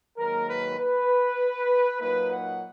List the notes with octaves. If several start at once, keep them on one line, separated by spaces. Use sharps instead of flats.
G#2 D#3 F#3 A#3 A#4
B4
B4
A#2 F#3 A#3 D#4 B4
F#5